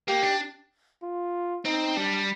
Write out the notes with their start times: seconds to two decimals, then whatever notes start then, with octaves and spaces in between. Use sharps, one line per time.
0.08 A#3 G4
0.23 D4
1.02 F4
1.65 C4 D#4
1.96 G3 D4